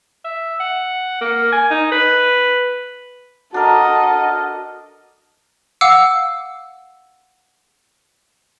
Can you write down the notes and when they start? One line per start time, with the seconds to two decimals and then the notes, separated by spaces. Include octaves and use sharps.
0.24 E5
0.60 F#5
1.21 A#3
1.53 G#5
1.70 D#4
1.92 B4
3.54 D4 F#4 A4 A#4 D#5
5.81 F5 F#5 D6 E6